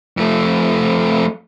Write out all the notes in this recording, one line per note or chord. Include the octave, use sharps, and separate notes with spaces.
F2 A3